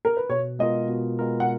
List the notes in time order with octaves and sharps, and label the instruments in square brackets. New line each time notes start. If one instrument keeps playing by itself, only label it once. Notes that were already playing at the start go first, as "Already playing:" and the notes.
[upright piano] A#4
B4
[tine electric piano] B2 [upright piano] C#5
[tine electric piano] G#3 B3 F4 A#4 [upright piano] D#5
[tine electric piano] B2
G#3 B3 F4 A#4
[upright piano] F#5